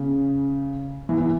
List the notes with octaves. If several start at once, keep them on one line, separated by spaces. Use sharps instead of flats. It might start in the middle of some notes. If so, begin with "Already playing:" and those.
Already playing: C#3
E3
E3